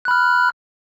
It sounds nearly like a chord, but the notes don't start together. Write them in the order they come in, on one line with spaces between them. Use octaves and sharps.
F#6 B5 F6